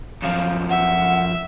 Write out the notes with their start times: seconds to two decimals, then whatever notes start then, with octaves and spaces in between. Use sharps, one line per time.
0.23 F#2 F3 F5
0.70 E5 F#5